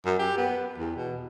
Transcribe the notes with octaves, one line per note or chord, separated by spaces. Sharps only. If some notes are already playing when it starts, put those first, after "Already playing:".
F#2
G4
B3
E2
B2